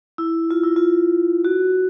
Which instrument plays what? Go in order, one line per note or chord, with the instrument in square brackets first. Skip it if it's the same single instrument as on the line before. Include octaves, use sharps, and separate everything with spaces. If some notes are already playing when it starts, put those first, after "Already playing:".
[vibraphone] E4
F4
E4
F4
F#4